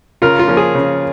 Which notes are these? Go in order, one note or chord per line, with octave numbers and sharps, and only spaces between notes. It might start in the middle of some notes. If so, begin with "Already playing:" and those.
C#3 F4 A#4
F4
F3 A#3 C#4
G#4
C#3